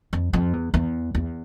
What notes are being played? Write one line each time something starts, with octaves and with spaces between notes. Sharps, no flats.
F2
F2
E2
E2
E2